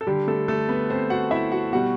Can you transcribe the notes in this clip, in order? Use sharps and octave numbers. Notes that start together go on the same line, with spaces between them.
A4
D3 G3 G4
A3 A4
A3 A4
B3 B4
C4 C5
F#4 F#5
E4 E5
F#4 F#5
B2 G3 F#4 F#5